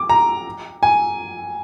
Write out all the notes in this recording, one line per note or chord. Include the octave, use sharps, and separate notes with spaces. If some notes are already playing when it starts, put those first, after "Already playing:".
Already playing: D6
A#5
G#5